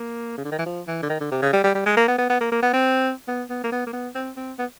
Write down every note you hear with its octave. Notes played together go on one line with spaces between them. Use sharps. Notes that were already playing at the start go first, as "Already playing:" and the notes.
Already playing: A#3
C#3
D3
D#3
E3
F3
E3
D3
D#3
D3
C3
C#3
G3
G3
G3
G#3
A#3
B3
B3
B3
A#3
A#3
B3
C4
B3
B3
A#3
B3
A#3
B3
C4
C4
B3